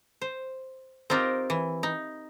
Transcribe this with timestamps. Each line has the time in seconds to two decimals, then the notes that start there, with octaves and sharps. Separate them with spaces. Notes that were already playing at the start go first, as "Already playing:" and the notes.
0.21 C5
1.10 C4 D#4 F4 G4 A#4
1.50 E3
1.83 D#4